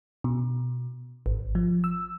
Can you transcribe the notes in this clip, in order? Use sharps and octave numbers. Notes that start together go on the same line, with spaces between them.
B2
G#1
F3
E6